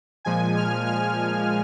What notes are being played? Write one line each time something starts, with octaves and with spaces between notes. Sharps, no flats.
A#2 F3 G#3 G#5
F6
F6